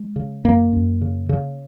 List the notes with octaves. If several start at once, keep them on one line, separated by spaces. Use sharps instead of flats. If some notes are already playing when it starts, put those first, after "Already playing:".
Already playing: G#3
C#3
F#2 A#3
F#2
C#3
C#3